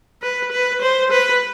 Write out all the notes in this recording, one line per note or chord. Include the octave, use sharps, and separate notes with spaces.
B4
B4
C5
B4